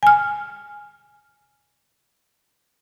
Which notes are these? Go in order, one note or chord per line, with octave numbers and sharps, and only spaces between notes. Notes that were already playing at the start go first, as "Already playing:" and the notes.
G#5 F6